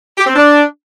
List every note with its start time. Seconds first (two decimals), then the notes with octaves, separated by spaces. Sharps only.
0.18 G4
0.27 C4
0.36 D4